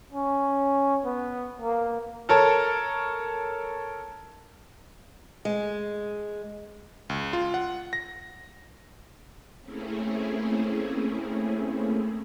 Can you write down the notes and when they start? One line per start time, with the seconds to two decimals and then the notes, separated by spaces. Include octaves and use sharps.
0.12 C#4
1.05 B3
1.62 A#3
2.29 A4 A#4 C#5 A5
5.45 G#3
7.10 C#2
7.33 F4
7.54 F#5
7.93 A#6
9.62 A3 A#3 C4 C#4 E4 G#4